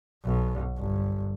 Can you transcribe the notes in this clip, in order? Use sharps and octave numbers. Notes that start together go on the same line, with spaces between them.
B1
G1